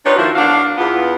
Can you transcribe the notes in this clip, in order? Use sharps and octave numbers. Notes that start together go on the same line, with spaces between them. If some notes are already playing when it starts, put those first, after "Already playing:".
D4 D#4 F4 G4 B4 C#5
D#3 F3 A#3 D4 E4 F#4
E2 D4 F#4 F5
E2 B3 F4